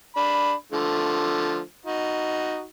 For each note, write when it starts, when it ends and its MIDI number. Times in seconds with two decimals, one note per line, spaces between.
0.16 0.52 62
0.16 0.52 83
0.72 1.62 50
0.72 1.62 53
0.72 1.62 57
1.85 2.65 63
1.85 2.65 66